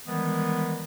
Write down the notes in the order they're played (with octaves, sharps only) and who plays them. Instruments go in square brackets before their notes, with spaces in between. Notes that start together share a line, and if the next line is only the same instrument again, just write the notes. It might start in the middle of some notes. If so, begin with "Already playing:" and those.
[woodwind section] D#3 E3 G3 G#3 B3